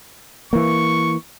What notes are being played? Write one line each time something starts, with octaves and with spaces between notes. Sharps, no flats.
E3 A#3 C#6